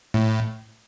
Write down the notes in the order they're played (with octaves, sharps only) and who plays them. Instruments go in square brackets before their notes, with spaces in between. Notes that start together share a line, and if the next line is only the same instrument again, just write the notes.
[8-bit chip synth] A2